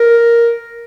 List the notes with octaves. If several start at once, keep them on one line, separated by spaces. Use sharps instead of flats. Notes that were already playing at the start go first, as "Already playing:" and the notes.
Already playing: A#4